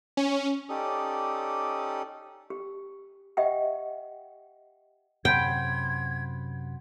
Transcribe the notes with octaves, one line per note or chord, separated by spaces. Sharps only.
C#4
C#4 D#4 G4 A4 D5 D#6
G4
G4 D#5 E5 F#5 G5
F#2 C3 F#5 G5 B5 C6 G#6